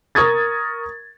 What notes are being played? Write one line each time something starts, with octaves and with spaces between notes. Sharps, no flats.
A#4 C#6 D#6 G#6 A6